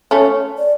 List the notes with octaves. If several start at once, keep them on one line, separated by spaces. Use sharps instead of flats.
A3 C#4 C#5
D5